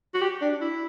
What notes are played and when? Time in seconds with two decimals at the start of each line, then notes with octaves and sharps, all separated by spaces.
0.14 F#4
0.22 G4
0.41 D4
0.61 E4